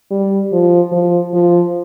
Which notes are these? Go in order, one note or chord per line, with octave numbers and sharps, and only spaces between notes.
G3
F3
F3
F3